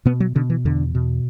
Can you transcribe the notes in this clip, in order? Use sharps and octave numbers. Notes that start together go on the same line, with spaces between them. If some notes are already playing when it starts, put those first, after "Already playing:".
B2 B3
F#3
B2 D3
E3
E2 D3
B2